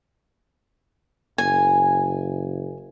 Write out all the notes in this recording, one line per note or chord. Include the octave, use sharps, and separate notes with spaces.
F#1 G#5